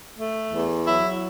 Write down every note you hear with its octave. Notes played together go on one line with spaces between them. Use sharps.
A3
E2
F#3 E4